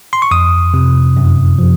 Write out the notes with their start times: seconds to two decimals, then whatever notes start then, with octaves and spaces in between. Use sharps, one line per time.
0.13 C6
0.22 C#6
0.31 F2 D#6
0.74 C3
1.17 F#2
1.59 F3